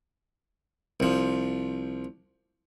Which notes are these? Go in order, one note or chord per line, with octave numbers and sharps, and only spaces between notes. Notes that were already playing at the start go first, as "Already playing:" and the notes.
C2 F3